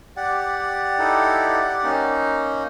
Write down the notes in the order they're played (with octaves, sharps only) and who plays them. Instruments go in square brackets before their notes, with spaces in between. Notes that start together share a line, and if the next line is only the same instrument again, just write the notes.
[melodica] G4 D5 F#5
[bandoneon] D#4 E4 A4
A#3 C#4 D#4